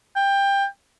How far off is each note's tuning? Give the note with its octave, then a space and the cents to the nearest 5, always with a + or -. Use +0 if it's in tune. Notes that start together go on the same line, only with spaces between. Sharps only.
G5 +20